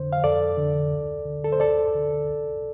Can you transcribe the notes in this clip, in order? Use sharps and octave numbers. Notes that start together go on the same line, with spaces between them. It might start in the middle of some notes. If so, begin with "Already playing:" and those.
Already playing: F2 D3 C5
F5
F2 A4 D5
D3
D2
D3
A4
C5
D2 A4 D5
D3
C2